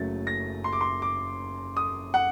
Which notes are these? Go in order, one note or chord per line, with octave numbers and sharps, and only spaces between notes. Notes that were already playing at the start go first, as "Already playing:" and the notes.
Already playing: F#1 F#2 F#3 A3 A6
A#6
C6
D6
C6
D6
D#6
F#5